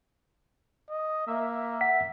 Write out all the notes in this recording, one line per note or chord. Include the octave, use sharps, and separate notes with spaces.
D#5
A#3 E5
F#5 B6